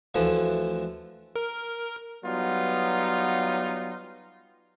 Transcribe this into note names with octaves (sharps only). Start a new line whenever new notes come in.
D2 E3 F3
A#4
F#3 G3 B3 D#4 F4